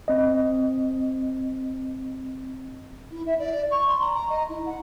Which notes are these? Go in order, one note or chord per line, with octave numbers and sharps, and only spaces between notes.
C4 D#5
E4
E5
D5
C#6
C6
A#5
A#5
D#5
E4
F#5